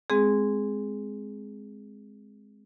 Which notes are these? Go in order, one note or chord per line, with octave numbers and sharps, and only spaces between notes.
G#3 C4 G#4